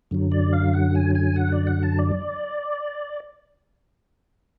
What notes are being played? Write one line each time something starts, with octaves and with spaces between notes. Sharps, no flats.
F#2 D3 F#3
D5
F5
F#5
G#5
G#5
F#5
D5
F#5
A5
D5